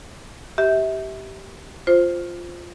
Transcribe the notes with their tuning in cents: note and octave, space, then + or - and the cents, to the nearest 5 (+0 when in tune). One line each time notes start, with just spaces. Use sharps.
G4 -15 E5 -30
F4 +0 C5 +0